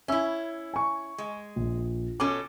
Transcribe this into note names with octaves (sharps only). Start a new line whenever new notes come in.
C#4 E4 E5 E6
G#5 C#6
G#3
A#1
B2 C#4 A4 D6